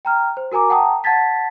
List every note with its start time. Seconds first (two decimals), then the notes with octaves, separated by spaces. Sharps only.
0.05 G5 A#5 F6
0.37 C5
0.52 F#4 A#4 G#5 A#5 D6
0.70 F#5 G5 A5 A#5 D#6
1.04 F#5 A5 G#6 A6 B6